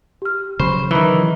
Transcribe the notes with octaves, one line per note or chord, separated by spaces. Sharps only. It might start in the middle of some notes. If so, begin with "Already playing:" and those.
G4 F6
C#3 F#3 C5 B5 C#6
D#3 E3 A#5 B5 G7